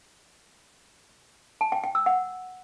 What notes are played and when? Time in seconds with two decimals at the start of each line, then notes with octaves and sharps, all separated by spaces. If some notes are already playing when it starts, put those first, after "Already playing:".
1.61 A5
1.72 G5
1.84 G5
1.95 E6
2.06 F#5